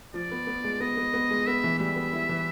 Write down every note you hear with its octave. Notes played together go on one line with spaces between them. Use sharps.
F3 D5
B3
B3
G#3
B3 D#5
B3
B3
G#3
B3 E5
E3
G3 E5
B3
E4
E3